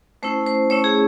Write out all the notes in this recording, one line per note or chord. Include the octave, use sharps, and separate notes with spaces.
A3 C#4 E4 C5
C5
A3 C#4 E4 C#5
G#4